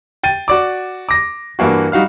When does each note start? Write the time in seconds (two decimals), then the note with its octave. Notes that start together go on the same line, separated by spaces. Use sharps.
0.23 G5 A6 D#7
0.48 F#4 D5 D6
1.09 D6 A#6
1.59 G2 E3 A#3 F#4
1.92 G3 D#4 F#4 F5 F6